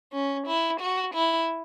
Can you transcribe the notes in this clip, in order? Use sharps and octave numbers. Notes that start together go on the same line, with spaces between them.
C#4
E4
F#4
E4